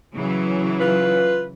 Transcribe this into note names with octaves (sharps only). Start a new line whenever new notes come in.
C#3 E3 F#3
F4 B4